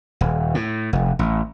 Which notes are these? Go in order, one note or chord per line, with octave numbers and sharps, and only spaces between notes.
D#1
A2
F1
A1